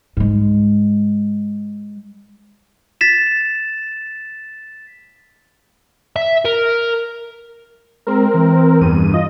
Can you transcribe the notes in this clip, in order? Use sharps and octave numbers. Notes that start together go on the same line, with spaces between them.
G#2 G#3
A6 B6 E7
E5
A#4
G#3 C4 A#4
E3
E2 G2 D#7
F4 D#5